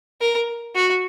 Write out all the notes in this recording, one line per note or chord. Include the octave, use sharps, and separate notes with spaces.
A#4
F#4